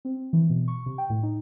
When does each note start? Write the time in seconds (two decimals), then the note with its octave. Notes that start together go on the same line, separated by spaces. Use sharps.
0.05 C4
0.33 E3
0.50 B2
0.68 C#6
0.86 C3
0.98 G5
1.10 A2
1.23 D#4